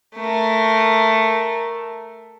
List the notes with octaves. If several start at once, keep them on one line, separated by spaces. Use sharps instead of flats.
A3 A#4